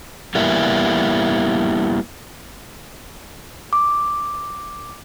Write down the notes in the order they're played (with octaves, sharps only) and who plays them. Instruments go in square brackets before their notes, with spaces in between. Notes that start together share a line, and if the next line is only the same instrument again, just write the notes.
[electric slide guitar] G3 A#3 B3 E4
[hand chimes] D6